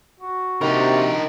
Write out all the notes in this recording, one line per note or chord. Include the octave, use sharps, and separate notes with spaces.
F#4
C3 D#3 A#3 D4 A#4